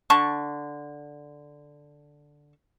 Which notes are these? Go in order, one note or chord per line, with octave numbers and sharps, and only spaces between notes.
D3 A5 C#6